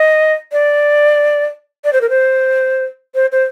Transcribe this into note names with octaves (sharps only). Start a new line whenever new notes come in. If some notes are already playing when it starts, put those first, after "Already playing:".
Already playing: D#5
D5
D5
C5
A#4
C5
C5
C5